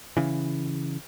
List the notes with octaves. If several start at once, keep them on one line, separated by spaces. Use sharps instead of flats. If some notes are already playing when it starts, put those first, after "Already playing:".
C#3 E3